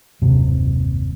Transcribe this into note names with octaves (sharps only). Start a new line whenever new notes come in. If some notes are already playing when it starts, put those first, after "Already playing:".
F#1 D#2 G#2 C3